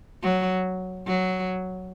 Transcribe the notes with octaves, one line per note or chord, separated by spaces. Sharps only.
F#3
F#3